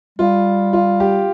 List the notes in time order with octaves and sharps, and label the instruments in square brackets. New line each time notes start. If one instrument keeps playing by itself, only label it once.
[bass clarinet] G3 [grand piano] F4
[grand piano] F4
G4